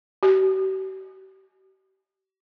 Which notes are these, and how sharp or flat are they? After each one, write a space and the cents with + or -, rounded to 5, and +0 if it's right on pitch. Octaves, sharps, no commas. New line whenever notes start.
G4 -45